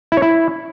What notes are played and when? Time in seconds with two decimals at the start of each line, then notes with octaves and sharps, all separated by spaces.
0.12 E4
0.17 C#5
0.22 E4